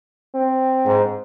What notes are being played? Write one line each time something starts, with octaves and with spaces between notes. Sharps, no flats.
C4
G#2